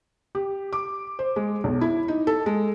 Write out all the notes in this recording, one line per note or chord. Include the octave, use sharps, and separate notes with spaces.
G4
D6
C5
G#3
B1
E4
D#4
A4
G#3